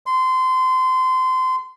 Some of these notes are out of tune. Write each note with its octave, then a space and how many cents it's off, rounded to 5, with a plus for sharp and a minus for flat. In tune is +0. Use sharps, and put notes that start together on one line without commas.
C6 -25